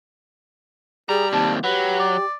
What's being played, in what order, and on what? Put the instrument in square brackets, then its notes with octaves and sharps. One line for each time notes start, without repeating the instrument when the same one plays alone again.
[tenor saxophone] G3 [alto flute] G#4 [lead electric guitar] A#5
[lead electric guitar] D#2 C3 [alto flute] A5
[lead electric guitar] F#3 [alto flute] G4 [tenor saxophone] B4
[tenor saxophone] D5